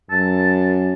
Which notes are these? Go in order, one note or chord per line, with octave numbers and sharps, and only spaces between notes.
F#2 A5